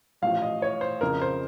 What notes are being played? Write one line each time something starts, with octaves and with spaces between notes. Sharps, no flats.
A1 A2 F3 F5
D#5
C#5
C5
F2 C#3 F3 A#4
C5